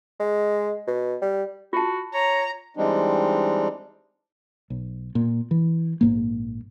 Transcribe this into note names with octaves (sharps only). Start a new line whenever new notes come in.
G#3
B2
G3
F4 F#4 A5
C#5 A#5
E3 G3 G#3 C4 D4 D#4
B1
A#2
E3
A#1 G#2 A#3